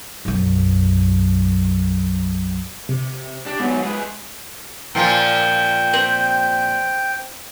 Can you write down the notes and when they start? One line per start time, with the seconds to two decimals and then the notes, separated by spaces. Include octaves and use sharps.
0.25 B1 F#2
2.89 C3
3.46 D4 G4
3.60 G#2 F#3 B3
3.83 G#3 G#4 B4
4.95 A#2 F3 F4 G5
5.94 C4